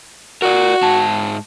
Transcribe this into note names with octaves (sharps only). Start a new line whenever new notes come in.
F#4 A#4 D5
G#2 A5